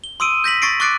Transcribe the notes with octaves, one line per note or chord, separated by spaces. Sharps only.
G7
C6 D#6 E6 D7 D#7
G6 A#6 B6 F#7
C#6 A6 A#6 C7 D7
C#6 D6 F#6 A6 C7 D7